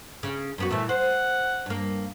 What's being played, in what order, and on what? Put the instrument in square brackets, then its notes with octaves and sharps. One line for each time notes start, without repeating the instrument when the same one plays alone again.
[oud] C#3
F#2 B3 F#4
[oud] A#2 E3 [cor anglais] A3
[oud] C5 [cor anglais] F#5
[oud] G2 A#3